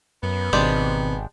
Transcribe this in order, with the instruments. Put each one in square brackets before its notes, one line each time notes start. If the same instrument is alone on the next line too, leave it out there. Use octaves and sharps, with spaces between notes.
[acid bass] F#2 [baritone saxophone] B3
[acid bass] G#1 [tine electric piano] B2 D#3 C4 [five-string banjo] G#3 D4 G4